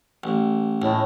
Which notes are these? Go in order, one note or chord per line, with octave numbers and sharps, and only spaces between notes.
A1
C#2 A2